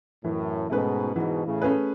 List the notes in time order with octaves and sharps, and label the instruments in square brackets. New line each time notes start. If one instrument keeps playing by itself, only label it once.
[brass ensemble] F#2 A2 [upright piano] E3
[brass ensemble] G#2 B2 [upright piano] A3 C#4 G#4 B4
[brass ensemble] G#2 B2 [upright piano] E3
[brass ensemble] A2 C#3
[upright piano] A3 C#4 G#4 B4